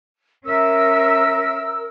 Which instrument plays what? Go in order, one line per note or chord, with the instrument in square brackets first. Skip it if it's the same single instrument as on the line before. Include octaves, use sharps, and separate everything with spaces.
[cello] C#4 E5 [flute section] A#4 E6